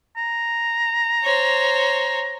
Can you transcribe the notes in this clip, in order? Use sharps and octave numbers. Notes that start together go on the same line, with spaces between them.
A#5
C5 C#5